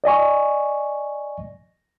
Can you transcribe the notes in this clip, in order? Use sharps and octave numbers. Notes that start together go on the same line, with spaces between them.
D5 D#5 G#5 C#6